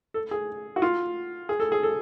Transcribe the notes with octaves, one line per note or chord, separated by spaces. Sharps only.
A4
G#4
F#4
F4
G#4
A4
G#4
A4